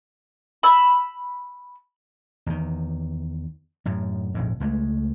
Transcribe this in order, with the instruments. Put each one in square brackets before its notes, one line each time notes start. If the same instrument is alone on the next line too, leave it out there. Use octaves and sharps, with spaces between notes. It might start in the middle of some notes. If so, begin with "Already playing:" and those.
[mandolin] B5 E6
[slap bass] E2 D#3
F#2 A2
A#1 F2 G#2
C#2 G#3 A3